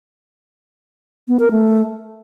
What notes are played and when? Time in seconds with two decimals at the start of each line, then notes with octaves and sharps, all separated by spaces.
1.28 B3
1.39 A#4
1.51 A3